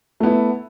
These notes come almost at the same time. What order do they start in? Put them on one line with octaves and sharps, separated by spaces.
A3 B3 E4